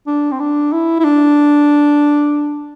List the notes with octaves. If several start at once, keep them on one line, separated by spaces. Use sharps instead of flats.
D4
C4
D4
E4
E4
D4